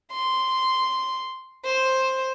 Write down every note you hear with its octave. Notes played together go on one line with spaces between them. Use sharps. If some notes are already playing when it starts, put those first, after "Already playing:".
C6
C5